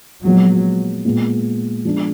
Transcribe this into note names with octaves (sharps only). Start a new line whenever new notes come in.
A#2 F3 F#3 G#3 B3
A#2 G#3 B3
F3 G#3 B3 D4